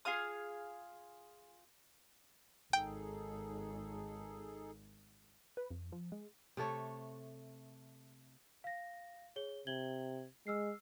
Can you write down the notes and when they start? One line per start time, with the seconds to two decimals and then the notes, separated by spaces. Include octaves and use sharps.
0.05 F4 G#4 F5 D#6
2.73 G#1 D#4 G#4 A4 G5
5.57 B4
5.71 F2
5.92 F3
6.12 G#3
6.57 C3 A3 A4 C#5
8.64 F5 A#6
9.36 G#4 C#5 G7
9.67 C3 G#6 F#7 G7
10.47 G#3 E6 F6 C7